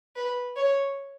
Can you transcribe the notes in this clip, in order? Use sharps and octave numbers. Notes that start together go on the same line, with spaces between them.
B4
C#5